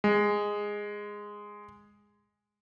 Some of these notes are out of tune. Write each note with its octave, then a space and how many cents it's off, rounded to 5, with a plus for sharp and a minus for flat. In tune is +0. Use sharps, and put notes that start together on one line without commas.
G#3 -10